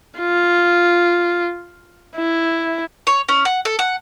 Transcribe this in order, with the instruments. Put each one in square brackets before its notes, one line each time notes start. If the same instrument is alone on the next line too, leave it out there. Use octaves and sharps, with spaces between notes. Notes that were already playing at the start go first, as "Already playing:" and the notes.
[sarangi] F4
E4
[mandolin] C#5
C#4
F#5
A4
F#5